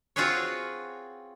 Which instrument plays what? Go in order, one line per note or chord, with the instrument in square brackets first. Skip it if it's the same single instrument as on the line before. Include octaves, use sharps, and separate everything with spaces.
[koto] C4 F4 F#4 G#4 B4 C#5